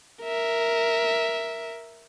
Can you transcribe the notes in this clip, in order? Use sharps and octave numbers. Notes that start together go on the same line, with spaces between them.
A#4 E5